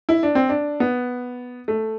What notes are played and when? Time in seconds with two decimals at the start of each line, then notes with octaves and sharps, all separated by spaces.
0.09 E4
0.23 D4
0.35 C4
0.49 D4
0.80 B3
1.68 A3